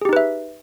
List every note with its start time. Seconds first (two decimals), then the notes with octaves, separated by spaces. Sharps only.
0.01 G#4
0.05 G4
0.09 D#4
0.13 B4
0.16 E5